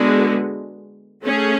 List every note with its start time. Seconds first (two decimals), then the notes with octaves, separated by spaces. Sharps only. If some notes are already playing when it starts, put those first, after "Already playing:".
Already playing: D3 G#3 B3 F#4
1.24 A3 C#4 G#4